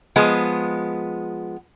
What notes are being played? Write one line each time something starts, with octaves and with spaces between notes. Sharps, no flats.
F3 G#3 B3